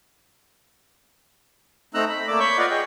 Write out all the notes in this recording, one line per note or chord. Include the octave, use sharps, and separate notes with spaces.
A3 C4 D#4 A#5 E6 F#6
B5
A3 A#3 D5 D6 E6
C#5 B5 C#6 G6
F4 B4 D5 D#5 F5 F#5
G#4 D#5 G5